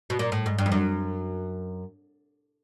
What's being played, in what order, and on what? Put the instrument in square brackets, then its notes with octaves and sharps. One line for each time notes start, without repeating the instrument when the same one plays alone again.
[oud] B2
A#2
A2
G#2
G2
F2
F#2